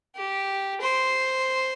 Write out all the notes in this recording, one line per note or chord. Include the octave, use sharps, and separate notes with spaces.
G4
C5